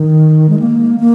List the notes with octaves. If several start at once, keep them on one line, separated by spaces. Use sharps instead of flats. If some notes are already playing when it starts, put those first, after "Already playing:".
Already playing: D#3
G#3
A#3
A#3